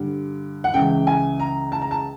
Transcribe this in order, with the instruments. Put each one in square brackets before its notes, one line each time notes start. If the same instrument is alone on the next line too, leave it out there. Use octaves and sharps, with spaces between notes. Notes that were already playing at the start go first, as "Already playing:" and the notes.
Already playing: [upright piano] G2 D3
F#5
C#2 C#3 E3 G5
G#5
A#5
A5
A#5
A5